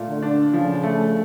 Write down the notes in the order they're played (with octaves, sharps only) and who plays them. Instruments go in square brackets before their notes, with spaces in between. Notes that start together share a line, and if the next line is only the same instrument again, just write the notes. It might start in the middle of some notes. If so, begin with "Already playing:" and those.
Already playing: [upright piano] A#2 A3
[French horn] D3
[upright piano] D4
[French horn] C#3 [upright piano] F3
[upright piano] A3